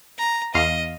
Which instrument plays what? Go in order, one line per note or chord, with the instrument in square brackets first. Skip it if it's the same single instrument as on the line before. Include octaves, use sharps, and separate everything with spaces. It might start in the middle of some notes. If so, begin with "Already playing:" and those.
[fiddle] A#5
[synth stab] E2 F5 [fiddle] D#5